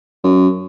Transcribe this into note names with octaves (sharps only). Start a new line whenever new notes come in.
F#2